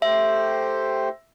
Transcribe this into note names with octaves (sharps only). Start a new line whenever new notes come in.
A3 G4 C5 E5